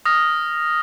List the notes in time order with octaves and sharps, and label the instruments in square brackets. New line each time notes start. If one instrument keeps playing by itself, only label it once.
[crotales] D#6 F6 A#6